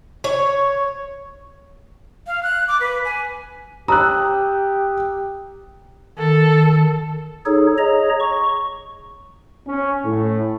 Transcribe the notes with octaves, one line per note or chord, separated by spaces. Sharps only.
C#5
F5
F#6
D6
B4
G#5
G4 A#5 D#6 E6 F#6
D#3 A4
D#4 G#4 A4 C#5
G#4 C#5 D#5 A#5
C#6
C#4
A2